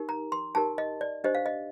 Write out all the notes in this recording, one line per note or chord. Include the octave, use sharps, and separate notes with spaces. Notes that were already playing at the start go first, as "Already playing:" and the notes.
Already playing: D#4 G4 A#4
A#5
C6
D#4 G4 A#4 A5
D#5
D5
D4 G4 C5 D#5
F5
D#5